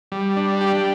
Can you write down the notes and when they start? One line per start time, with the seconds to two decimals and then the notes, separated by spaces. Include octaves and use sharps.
0.12 G3
0.36 D4
0.61 G4